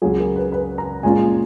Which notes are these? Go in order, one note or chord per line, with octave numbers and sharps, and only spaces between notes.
C#2 C#3 F#3 G#4
A#4
B4
B4
A#5
A#2 G#3 C#4 F4 G#5